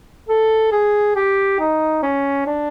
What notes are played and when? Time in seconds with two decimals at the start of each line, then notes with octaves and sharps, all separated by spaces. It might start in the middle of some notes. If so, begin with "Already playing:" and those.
0.29 A4
0.72 G#4
1.16 G4
1.59 D#4
2.03 C#4
2.47 D4